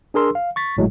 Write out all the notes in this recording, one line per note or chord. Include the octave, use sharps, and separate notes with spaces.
D4 G#4 A#4 C6 E6
F5
C#6 A6 B6
G#1 A2 F#3 G#3